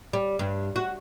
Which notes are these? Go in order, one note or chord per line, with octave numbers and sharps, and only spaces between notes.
G3
G2
F#4